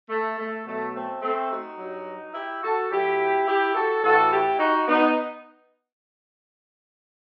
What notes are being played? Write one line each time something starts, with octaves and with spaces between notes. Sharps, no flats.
A3
A3
B2 F#3 A3
A3 C4
A3 C4
D#4 F#4
G2 F#3
E4 G4
F#4 A4
A2 F#3 E4 G4
E4 G4
F#4 A4
A2 E3 F#4 A4
E4 G4
D#4 F#4
B3 D#4